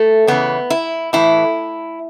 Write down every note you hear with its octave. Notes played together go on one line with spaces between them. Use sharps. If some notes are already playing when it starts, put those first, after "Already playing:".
Already playing: A3
E2 C#3 E3 B3
E4
A2 E3 E4